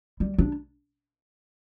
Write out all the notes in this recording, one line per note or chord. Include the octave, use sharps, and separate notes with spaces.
G3
D4